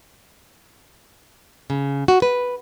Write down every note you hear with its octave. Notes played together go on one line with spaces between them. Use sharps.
C#3
F#4
B4